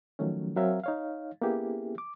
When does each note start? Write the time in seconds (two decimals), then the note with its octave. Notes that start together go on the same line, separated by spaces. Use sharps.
0.19 D#3 F3 F#3 A3 C#4
0.57 F#3 C4 A#4 E5 F5 G#5
0.84 D#4 C#5 F5
1.41 A#3 B3 C#4 E4 G4 G#4
1.98 D6